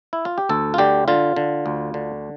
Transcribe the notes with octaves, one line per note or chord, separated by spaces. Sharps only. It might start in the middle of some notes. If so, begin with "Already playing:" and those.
E4
F4
G4
D2 A4
F4
D3 G4
D3 F4
D3
D2
D3